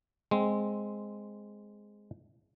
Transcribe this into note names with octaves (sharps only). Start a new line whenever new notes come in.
G#3 C4